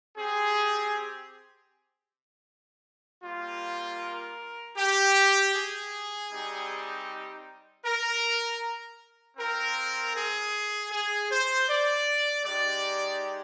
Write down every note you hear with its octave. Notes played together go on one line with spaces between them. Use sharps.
C4 G4 G#4
G3 A#3 F4
A#4
G4
G#4
G3 C4 D#4 G4
A#4
C4 F4 A#4
G#4
G#4
C5
D5
G#3 D#4 G4 D5